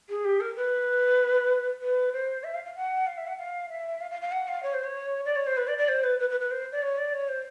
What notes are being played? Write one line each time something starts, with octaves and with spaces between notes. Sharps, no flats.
G#4
G4
A#4
B4
B4
C5
E5
F5
F5
F#5
F5
E5
F#5
F5
E5
F5
F5
F5
F#5
F5
C#5
C5
C#5
D5
C#5
C5
B4
D5
D5
C5
B4
B4
B4
B4
C5
D5
C#5
D5
C#5
C5